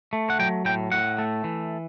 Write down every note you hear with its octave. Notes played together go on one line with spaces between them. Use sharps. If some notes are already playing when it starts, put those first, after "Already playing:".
A3
F#5
F#3 G5
A2 G5
A2 F#5
A3
E3